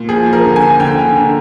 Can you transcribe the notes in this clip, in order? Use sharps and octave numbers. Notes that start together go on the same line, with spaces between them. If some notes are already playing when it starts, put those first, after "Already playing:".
Already playing: A#2
F3 G#4
F3
A#4
D3
G#5
D3
D3 G5
D3
D3